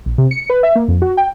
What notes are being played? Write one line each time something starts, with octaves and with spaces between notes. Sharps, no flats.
A#1
C3
C#7
B4
E5
A#3
F2
F#4
G5